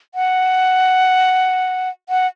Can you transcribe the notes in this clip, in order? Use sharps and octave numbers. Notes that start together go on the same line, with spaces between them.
F#5
F#5